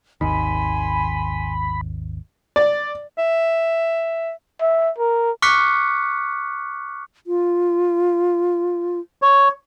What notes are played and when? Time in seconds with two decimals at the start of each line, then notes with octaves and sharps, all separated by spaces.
0.21 G#1 D#2 D#3 G#5 B5 C6
2.56 D5
3.18 E5
4.61 E5
4.98 A#4
5.42 C#6 D6 F6 F#6 B6 C#7
7.27 F4
9.22 C#5